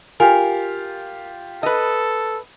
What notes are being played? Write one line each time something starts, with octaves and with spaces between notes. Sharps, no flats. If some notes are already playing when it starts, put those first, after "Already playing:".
F4 G4 A#4 G#5
A4 B4 D#5